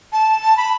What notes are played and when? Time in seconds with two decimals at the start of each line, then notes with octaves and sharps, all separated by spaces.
0.12 A5
0.57 B5